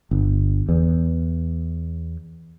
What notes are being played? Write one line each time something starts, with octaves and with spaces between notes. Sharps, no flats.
G1
E2